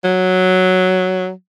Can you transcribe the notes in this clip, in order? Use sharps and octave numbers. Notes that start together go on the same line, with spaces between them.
F#3